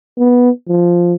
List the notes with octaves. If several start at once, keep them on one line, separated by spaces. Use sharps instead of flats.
B3
F3